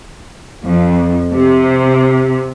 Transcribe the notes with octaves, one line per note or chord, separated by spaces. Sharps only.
F2
C3